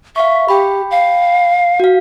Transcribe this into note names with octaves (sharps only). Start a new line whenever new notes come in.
E5 F5 C#6
G4 G5 B5
F5
F#4 F5